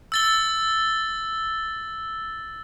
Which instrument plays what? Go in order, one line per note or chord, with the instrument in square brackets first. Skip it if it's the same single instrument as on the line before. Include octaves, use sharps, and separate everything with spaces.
[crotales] E6 A6 G7